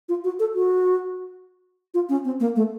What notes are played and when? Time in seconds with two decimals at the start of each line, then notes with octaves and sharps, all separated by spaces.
0.09 F4
0.24 F#4
0.39 A4
0.54 F#4
1.94 F4
2.09 C#4
2.25 C4
2.40 A#3
2.56 A3